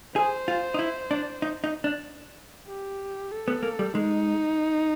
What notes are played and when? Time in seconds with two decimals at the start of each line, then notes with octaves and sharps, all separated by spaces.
0.16 G#4 C5
0.48 F4
0.74 D#4
0.79 E4
1.11 D4
1.42 D#4
1.64 D#4
1.84 D4
2.69 G4
3.32 A4
3.48 B3
3.63 A#3
3.79 G3
3.94 G#3 D#4